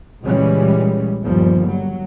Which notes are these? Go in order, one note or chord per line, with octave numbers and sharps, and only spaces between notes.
C#2 A#2 E3 G3 G#3 C#4
G1 D#2 F3 G3
F#3